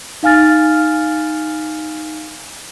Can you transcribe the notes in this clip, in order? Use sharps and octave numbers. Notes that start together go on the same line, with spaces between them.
D#4 F5 G#5 F6 A6